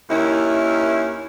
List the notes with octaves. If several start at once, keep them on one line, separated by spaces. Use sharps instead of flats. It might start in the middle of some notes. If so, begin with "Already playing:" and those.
D#2 D#3 C#4 E4